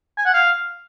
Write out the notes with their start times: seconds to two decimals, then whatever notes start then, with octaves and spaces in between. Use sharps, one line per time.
0.18 G#5
0.26 F#5
0.33 F5